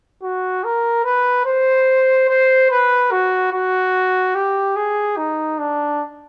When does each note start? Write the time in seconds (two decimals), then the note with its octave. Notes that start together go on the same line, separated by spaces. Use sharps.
0.22 F#4
0.64 A#4
1.05 B4
1.46 C5
2.29 C5
2.70 B4
3.11 F#4
3.52 F#4
4.35 G4
4.76 G#4
5.17 D#4
5.59 D4